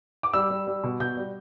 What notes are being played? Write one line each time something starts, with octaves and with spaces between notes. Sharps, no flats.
D6
G3 E6
G3
G3
B2
B2 G6
G3